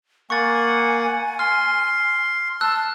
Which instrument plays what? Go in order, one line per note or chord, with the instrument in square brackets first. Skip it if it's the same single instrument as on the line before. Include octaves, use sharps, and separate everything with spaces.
[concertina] A#3 F#5 [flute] G#5 [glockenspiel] C#6 A6
[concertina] C6 [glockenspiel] F6
[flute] A5 [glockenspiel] E6 F#6